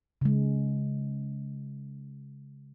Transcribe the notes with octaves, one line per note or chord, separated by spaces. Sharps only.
C#3 G#3